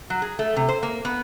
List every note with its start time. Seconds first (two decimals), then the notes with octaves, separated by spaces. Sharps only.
0.10 F#3
0.22 G#4
0.39 A3
0.56 C3
0.69 C5
0.83 A#3
1.05 B3